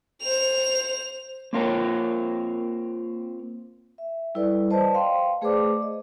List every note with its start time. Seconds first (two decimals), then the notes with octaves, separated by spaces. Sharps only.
0.22 C5 F7
1.53 A#3 C4 F4 A#4 C#5 G5
3.98 E5
4.35 G3 E4 A4 B4 D5
4.70 B4 C5 D5 D#5 A5
4.94 F5 G5 C6
5.41 A3 G#4 B4 C5 D5 D6
5.82 D#5